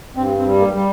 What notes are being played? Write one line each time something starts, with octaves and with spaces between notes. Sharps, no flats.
G2 C4
C4
G3
A#3
G3